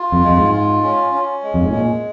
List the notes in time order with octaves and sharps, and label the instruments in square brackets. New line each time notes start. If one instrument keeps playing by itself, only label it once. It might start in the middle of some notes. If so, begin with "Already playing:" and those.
Already playing: [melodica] F4
[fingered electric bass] F2
[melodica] G#3
[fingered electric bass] F2
G#2
[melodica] F4
C#4
C#4
G#3
[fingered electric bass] F2
G#2
[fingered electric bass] A#2 [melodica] G#3